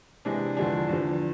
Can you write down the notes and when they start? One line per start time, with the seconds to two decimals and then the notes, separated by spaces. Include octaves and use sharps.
0.25 C3 E3 G#3 D4
0.57 E2 D3 F3 G#3 D4
0.88 E2 D3 F3